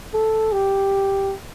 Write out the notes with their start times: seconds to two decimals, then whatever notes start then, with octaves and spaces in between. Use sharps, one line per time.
0.14 A4
0.52 G4